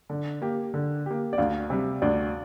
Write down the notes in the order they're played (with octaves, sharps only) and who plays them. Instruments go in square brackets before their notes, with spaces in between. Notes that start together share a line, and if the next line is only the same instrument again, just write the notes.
[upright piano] D3
A#3 G4
D3
A#3 G4
[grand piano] D5
[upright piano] D2 [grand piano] F5
[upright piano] C3 G3
[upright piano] D2 [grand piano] D5